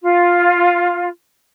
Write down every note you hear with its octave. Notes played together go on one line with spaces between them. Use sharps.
F4